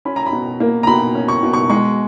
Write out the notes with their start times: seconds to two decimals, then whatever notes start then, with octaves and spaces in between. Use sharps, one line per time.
0.05 C#4 B5
0.16 A#5
0.26 B5
0.33 B2
0.60 A#3
0.83 A#5
0.87 B2 B5
1.15 C#4
1.28 C#6
1.43 B2
1.53 C#6
1.69 G#3 C#6